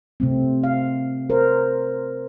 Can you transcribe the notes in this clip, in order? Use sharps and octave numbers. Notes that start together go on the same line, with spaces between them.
C3 A3 C4
F5
A#4 C5